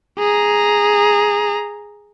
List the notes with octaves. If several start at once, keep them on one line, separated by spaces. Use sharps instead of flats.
G#4 A#5